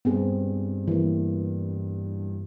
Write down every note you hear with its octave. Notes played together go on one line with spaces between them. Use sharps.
G2 B3 C4 G#4
E3 A#3